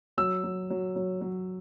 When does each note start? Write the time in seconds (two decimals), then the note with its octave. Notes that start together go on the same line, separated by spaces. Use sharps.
0.17 F#3 E6
0.44 F#3
0.70 F#3
0.96 F#3
1.21 F#3